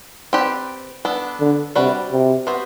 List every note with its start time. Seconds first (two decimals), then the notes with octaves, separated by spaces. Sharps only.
0.33 C4 G4 B4 D5
1.05 B3 D4 A4
1.40 D3
1.75 C3 G3 D4 F#4 B4 D5
2.12 C3
2.47 B3 F#4 C5 E5